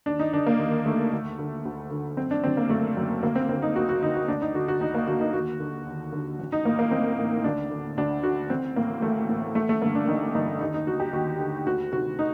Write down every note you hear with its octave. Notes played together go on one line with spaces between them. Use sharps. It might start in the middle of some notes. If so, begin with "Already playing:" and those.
D#2 D4
D#4
D3 D4
A#3
D#2
D3 A3
D2
D3
D2
D3
F#1 C4
D4
F#2 D3 C4
A#3
F#1 A3
F#2 D3
D2 A#3
C4
D3 C4
D#4
D2 F#4
F#4
D3 D#4
F#4
D2 D4
D#4
D3 F#4
F#4
D2 D#4
A#3
D3 F#4
D#4
D#2 F#4
D3
D#2
D3
A1
D#4
A2 A#3
A#3
A1 C4
A2
D2 D4
D3
D2 D4
D3 F#4
A1 C4
A2 A#3
A1 A3
A2
A1 A3
A3
G2 D3 A#3
D4
A1 D#4
G2 D3 D#4
D#2 D#4
D#4
D3 F#4
G4
D#2 F#4
D3
D2 F#4
C3 D#3 F#4
D#4